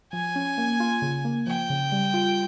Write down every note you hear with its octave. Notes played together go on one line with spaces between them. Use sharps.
F3 G#5
C#4
A#3
F4
C#3
A#3
F3 G5
C#3
G3
F4